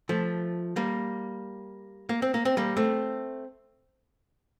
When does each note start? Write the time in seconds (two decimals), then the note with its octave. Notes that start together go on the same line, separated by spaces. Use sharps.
0.09 F3 A3
0.76 G3 A#3
2.09 A#3
2.22 C4
2.34 A#3
2.45 C4
2.57 G3 A#3
2.77 A3 C4